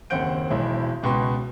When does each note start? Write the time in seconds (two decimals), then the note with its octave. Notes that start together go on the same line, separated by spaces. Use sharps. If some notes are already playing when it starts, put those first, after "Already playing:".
0.10 F#1 D#2 C4 F#5 G6 D7
0.50 E1 B1 E4
1.03 C#2 B2 B4 G5 C6